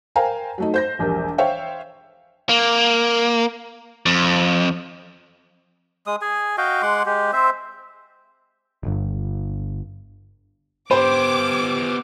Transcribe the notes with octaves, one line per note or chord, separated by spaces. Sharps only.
A#4 C5 F5 G5 G#5 A#5
F#3 A3 D#4
C5 G6 A#6
E1 A#1 G3 A#4
C5 C#5 E5 F5 G5
A#3
F2
G#3 D#6
G#4 G#5
F#4 D#5 F5 G5
G#3 F#5 C6 D6
G#3 G4
C4 C5 E5
D1 G1
B3 G4 C5 D6